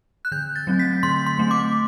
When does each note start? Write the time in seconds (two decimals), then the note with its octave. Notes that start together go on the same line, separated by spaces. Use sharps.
0.25 F#6
0.32 D3 G6
0.56 A6
0.67 F#3 A3 C4
0.79 B6
1.03 D3 C6
1.26 C6
1.38 F#3 A3 C4
1.51 D6